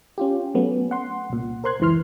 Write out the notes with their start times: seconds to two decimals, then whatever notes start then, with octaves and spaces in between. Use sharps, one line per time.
0.18 C#4 F4 G4
0.54 F#3 A3 B3 C#4
0.91 F#5 C6
1.30 C2 A#2
1.64 A#4 C5 C6 F#6 G#6
1.80 C#2 F#2 E3 C6 F6